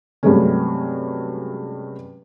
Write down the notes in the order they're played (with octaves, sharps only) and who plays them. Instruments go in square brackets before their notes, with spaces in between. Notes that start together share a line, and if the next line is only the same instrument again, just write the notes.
[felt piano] G2 C3 F#3 G#3 A3 C#4